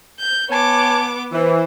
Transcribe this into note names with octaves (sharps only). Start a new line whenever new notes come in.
G6
B3 C#5 G#5 A5 D6
E3 C5